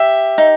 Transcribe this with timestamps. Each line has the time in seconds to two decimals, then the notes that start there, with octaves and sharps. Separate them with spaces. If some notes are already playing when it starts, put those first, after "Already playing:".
Already playing: G4 E5
0.38 D#4